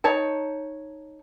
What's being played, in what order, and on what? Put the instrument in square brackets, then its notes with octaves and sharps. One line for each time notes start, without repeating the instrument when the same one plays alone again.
[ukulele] D#4 C#5 A5